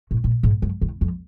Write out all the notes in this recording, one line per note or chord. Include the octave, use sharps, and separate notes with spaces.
A2
A#2
G#2
F#2
E2
F2